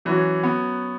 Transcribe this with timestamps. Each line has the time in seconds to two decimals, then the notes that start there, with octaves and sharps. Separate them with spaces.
0.05 E3 F#3 C#4 F#4
0.43 B3